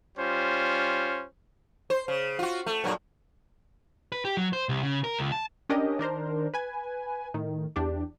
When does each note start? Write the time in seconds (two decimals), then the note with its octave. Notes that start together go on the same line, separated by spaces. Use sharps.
0.18 G3 C#4 F4 C5
1.90 C5
2.08 C#3
2.39 F4 F#4
2.66 A3
2.84 G2 A#2 F#3
4.12 B4
4.25 G4
4.37 F#3
4.53 C5
4.69 C2
4.83 C#3
5.04 A#4
5.19 C#2
5.32 A5
5.69 C#4 D4 G4 A#4 D#5
5.99 D#3 D4 A#4 C5
6.54 B4 G#5
7.34 A2 D#3
7.76 E2 D4 G4